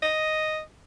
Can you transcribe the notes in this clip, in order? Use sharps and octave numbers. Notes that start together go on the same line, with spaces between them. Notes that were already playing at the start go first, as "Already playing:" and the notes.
D#5